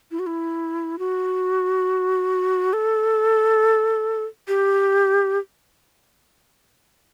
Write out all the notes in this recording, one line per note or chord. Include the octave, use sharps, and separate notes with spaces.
E4
F#4
E4
F#4
A4
G4